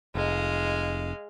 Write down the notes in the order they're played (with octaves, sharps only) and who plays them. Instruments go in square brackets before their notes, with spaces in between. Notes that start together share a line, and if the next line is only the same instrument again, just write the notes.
[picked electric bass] F1 [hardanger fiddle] G#3 F5